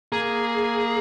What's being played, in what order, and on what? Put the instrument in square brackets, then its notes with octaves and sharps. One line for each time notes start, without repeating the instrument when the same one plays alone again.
[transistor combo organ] A#3 [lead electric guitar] G#4